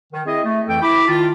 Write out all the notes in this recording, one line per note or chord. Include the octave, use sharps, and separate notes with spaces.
D#3
C4 E4 G#4 D#5
A3
F2 E3 A4 G5
E4 B5 D6
D#3 F4 A5